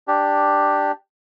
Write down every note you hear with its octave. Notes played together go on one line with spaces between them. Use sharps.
D4 G4